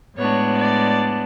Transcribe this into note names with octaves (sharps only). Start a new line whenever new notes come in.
A2 G#3 B3 D4 C#5
D5